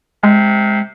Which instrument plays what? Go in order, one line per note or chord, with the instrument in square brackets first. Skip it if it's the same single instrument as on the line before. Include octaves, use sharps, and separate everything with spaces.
[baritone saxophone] C3 [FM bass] G#3